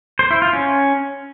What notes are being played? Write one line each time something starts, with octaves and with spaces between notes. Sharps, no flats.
C5
E4
F4
C#4